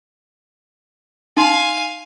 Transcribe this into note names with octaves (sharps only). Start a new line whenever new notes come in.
D#4 F5 G#5 C6